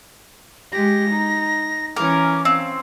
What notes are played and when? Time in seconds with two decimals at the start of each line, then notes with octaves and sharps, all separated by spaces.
0.73 G#3 G4 A#6
1.11 D#4
1.96 E3 C#4 A#4 D6
2.45 C4 F5